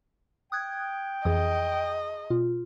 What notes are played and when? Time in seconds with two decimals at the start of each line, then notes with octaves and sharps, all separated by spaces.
0.52 G5 D#6 F#6 G#6
1.25 F2 E3 G#4 D#5 D#6
2.30 B2 F4